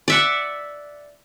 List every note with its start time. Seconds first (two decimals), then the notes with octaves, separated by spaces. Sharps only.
0.08 D5 E5 F#5